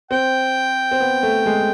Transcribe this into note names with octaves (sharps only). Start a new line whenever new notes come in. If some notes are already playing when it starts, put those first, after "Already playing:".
C4 G5
C4
B3
A3
G#3